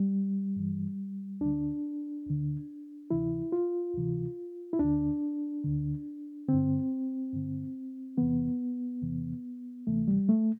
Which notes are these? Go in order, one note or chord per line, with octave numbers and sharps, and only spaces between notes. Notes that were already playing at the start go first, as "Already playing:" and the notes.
Already playing: G3
G2 E3
D2 D3 D4
D2 D3
D2 C3 E3 E4
F4
D2 C3 E3
E4
D2 D4
D3
D2 D3
G2 D3 C4
G2 D3
E2 C3 E3 B3
E2 C3 E3
D2 C3 E3 A3
G3
A3